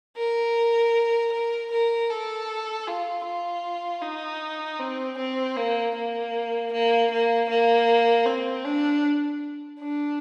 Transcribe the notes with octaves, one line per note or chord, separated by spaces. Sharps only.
A#4
A#4
A#4
A4
F4
F4
D#4
C4
C4
A#3
A#3
A#3
A#3
A#3
C4
D4
D4